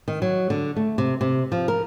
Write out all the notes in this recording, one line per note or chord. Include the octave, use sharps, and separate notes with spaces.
D#3
F#3
D3
A3
C3
C3
F3
A#4